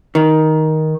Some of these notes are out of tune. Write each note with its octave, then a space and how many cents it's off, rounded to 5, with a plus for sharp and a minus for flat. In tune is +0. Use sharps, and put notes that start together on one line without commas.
D#3 +10